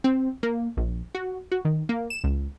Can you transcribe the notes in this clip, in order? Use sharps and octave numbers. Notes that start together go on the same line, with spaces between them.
C4
A#3
A#1
F#4
F#4
D#3
A#3
E7
C#2